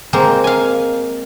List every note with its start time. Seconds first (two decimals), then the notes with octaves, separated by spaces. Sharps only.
0.13 G#3 A#3 C4 C5
0.44 F5 G#5